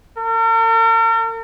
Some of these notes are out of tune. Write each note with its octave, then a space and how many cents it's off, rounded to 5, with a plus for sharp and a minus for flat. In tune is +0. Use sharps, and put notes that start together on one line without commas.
A#4 -45